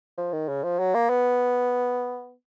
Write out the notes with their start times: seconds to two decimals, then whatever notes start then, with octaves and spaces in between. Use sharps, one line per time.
0.18 F3
0.33 D#3
0.48 C#3
0.64 F3
0.79 F#3
0.94 A#3
1.10 B3